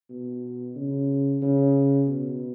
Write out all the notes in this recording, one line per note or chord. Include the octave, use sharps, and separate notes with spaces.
B2
C#3
C#3
B2